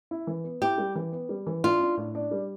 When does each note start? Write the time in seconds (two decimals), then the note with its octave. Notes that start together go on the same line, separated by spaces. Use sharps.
0.11 E4
0.27 E3
0.44 B3
0.62 E4 G4
0.78 G3
0.96 E3
1.12 B3
1.29 G3
1.47 E3
1.64 D4 F4
1.80 D4
1.97 A2
2.15 D4
2.31 G3